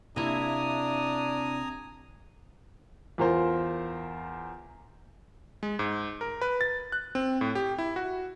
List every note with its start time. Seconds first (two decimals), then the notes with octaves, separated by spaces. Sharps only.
0.16 C3 A#3 D4 E4 G#5 A#5 D#6
3.18 E2 F4 A#4 C5
5.63 G#3
5.79 G#2
6.21 A#4
6.41 B4
6.61 A6
6.92 F#6
7.15 C4
7.41 A2
7.55 G4
7.78 E4
7.96 F#4